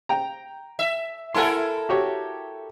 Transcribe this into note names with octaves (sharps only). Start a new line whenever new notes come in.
G5 A#5
E5
E4 A4 A#4 F#5 G#5 C6
F#4 G4 C#5